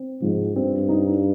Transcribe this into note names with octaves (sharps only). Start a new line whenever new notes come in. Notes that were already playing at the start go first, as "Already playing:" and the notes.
Already playing: C4
G#2 F3
G2 C4
D#4